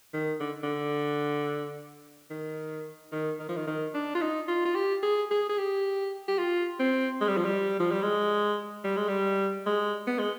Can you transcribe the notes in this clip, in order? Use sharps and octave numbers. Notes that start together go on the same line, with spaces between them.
D#3
D3
D3
D#3
D#3
D#3
F3
D#3
D#3
D4
F4
D#4
F4
F4
G4
G#4
G#4
G#4
G4
G4
F4
C4
G#3
G3
F3
G3
F3
G3
G#3
G3
G#3
G3
G#3
B3
G#3